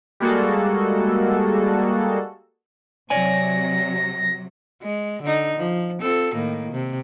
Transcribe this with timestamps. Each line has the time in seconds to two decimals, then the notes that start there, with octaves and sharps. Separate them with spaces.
0.20 G3 G#3 A#3 F#4 G#4 A4
3.10 C3 F#3 C#5 D5 G#5 A#6
4.82 G#3
5.23 D3 D#4
5.57 F3
6.02 C4 F4 A4
6.34 A2 D#3 A#3
6.72 C3